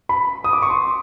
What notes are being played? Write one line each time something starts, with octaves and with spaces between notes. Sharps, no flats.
B5
D#6
D6
C#6
C6